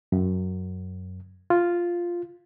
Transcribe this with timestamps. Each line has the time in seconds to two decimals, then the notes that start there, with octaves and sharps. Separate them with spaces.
0.12 F#2
1.50 F4